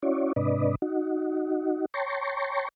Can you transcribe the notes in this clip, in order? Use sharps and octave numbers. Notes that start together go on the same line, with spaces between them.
C#4 E4 F#4 C#5 D5
G#2 C3 D4 B4 D5 D#5
D#4 F#4
C#5 G5 A5 A#5 C6 C#6